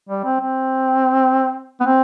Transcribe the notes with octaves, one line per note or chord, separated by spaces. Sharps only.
G3
C4
C4
B3
C4